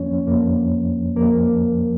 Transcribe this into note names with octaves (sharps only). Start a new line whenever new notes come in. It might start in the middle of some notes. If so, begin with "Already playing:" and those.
Already playing: F2 F3 A#3 C#4 C#5
F2 F3 A#3
F2 F3 A#3 A#4